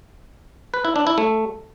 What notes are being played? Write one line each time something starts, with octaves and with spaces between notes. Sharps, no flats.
B4
E4
D4
E4
A3